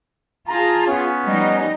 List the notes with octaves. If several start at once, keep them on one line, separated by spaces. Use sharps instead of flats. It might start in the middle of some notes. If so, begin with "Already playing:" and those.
F4 G#4 A5 A#5
B3 C#4
F3 G3 D#4